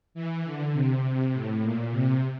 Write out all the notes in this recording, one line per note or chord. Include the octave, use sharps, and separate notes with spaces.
E3
D3
C3
A2
A#2
C3